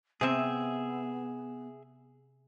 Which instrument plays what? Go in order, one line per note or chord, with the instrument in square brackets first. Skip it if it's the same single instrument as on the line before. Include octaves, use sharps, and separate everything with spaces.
[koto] C3 C4 [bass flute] B3 [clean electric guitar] G#4 E5